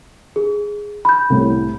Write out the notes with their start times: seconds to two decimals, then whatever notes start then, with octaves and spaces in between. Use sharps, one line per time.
0.36 G#4
1.05 B5 G6
1.30 C2 A2